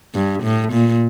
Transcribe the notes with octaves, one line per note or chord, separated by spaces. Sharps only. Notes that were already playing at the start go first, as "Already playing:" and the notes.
G2
A2
A#2